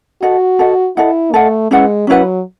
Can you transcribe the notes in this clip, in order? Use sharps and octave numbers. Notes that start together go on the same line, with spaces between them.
F#4 A4 D#5 F#5
A4 D#5 F#5
E4 A4 D#5 F#5
A3 A4 D#5 F#5
G#3 C#4 E4 B4 F#5
F#3 C#4 E4 B4 F#5